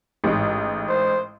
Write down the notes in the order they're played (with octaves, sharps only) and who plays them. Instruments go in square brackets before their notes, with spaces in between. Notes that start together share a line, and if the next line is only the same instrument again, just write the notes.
[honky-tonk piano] A1 G#2
[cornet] C5